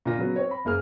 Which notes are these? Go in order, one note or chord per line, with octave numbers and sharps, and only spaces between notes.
A#2 D3 A#3 F4 A#6
C#3 F#3 B3
C4 C#5
B5
F#1 A#3 G#4 F6